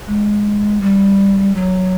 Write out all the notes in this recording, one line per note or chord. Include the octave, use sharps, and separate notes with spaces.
G#3
G3
F#3